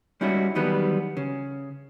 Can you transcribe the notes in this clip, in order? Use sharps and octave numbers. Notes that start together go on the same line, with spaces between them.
G3 G#3 C#4 D#4 E4 F#4
E2 D#3 F#3 G3 B3 B4
C#3